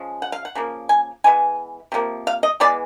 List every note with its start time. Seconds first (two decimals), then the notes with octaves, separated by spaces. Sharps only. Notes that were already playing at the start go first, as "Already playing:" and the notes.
Already playing: C#3 F3 G#3
0.22 F#5
0.32 F5
0.45 F#5
0.55 C#3 F3 A#3
0.89 G#5
1.24 E3 G#3 B3 G#5
1.92 C3 F3 A#3
2.27 F5
2.43 D#5
2.60 E3 G#3 B3 D5